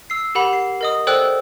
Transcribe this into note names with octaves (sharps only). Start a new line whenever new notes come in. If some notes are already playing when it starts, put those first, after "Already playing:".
E6 C7
G4 A#4 F#5 B5
C7
A#4 D#5 D#6
A4 C5 D5 G5 E6 F#6